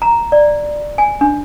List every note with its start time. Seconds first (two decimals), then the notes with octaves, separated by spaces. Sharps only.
0.02 A#5
0.32 D5
0.98 G#5
1.21 D4